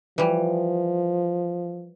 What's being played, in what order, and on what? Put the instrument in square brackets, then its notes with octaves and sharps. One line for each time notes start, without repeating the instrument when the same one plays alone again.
[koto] E3 G3 [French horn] F3